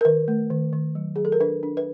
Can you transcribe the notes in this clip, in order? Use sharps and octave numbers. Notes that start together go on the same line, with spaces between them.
A#4
D#3 B4
A3
D#3
D#3
F#3
F#3 G#4
A4
A#4
D4 B4
D4
B4